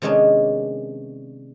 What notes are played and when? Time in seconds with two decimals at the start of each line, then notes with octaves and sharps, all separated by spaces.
0.02 C3 D#3 G#3 B3 C#4 D4